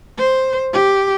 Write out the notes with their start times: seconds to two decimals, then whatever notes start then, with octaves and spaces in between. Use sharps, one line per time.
0.18 C5
0.73 G4